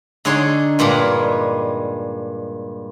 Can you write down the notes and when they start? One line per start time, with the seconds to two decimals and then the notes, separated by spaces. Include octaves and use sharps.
0.25 D3 D#4 G#4 C#5 C6
0.79 G2 A#2 G3 G#3